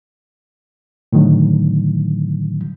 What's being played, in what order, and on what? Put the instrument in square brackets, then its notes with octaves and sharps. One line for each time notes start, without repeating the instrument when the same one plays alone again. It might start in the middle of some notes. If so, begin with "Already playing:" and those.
[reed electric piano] A2 D3 D#3 F#3